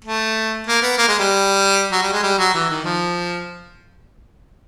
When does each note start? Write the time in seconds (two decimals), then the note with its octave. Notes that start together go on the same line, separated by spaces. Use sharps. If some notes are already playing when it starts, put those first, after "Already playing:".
0.05 A3
0.67 A#3
0.83 B3
0.98 A#3
1.08 G#3
1.19 G3
1.92 F#3
2.02 G3
2.13 G#3
2.23 G3
2.39 F#3
2.54 E3
2.70 D#3
2.85 F3